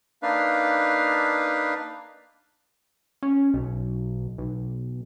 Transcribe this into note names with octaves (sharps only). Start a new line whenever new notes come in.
A#3 D4 D#4 B4 F5
C#4
B1
B1